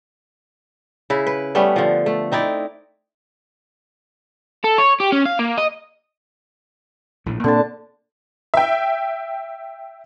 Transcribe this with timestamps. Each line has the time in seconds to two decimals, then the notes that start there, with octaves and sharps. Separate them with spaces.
1.10 C#3 E4
1.27 B4
1.55 G3 A3 B3 C#4
1.76 D3 F3
2.06 A3
2.32 C4 D#4 E4 D5
4.64 A4
4.78 C#5
5.00 G4
5.12 C#4
5.25 F5
5.39 A#3
5.58 D#5
7.26 A#1 A2
7.44 A#2 D3 A#3 C4 A5
8.54 E5 G5